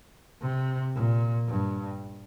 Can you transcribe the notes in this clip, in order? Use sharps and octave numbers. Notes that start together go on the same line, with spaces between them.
C3
A#2
G2